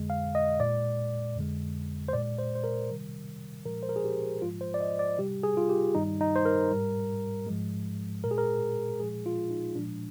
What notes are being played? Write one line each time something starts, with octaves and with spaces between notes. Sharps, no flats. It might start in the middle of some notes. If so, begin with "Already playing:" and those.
Already playing: F2 D3 G#3
F5
D#5
A#2 G#3 D5
F2 D3 G#3
C5
A#2 G#3 D5
C5
C5
A#4
C3 D#3 G3
A#2 F3 G#3 A#4
C5
A#4
G#4
G4
G#2 F3 G#3 F4
C5
D5
D#5
D5
C3 G3 G4
G#4
F4
G4
G2 D#3 G3 D#4
D#4
C5
A#4
G#2 G3
G#2 F3 G#3
A#2 G#3 A#4
G#4
A#4
A#2 F3 G#3 G#4
F4
D#4
A#2 F3 G#3 D4